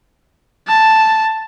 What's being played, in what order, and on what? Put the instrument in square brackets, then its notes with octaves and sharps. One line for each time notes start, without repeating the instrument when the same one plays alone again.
[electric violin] A5